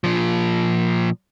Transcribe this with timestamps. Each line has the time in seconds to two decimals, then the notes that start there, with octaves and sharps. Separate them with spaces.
0.04 A#2 F3